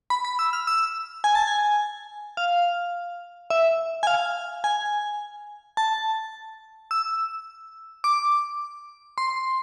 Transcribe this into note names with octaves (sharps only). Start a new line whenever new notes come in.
B5
B5
E6
F6
E6
G#5
A5
G#5
F5
E5
G#5
F5
G#5
A5
E6
D6
C6